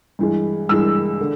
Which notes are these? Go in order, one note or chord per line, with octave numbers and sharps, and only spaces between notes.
G2 E3 G#3
G2 E3 G#3 E6
D3